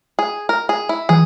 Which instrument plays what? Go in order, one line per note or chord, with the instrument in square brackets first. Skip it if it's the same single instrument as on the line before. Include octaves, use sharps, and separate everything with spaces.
[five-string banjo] G#4
A#4
G#4
E4
[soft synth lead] E3 [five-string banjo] G#4